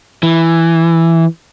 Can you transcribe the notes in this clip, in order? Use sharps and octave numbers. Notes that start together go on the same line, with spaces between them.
E3